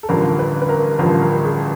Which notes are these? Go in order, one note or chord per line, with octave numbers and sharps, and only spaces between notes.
A4
A1 G2 D3 F3 A#4
B4
B4
A#4
A1 G2 D3 F3 A#4
A#4
G#4